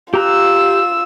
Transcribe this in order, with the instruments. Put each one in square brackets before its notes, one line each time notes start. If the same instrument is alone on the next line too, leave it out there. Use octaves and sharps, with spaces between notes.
[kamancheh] F4 E6 [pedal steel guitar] G4 A#5 F#6